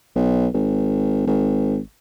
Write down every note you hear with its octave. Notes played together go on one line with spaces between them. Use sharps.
B1
G#1
G#1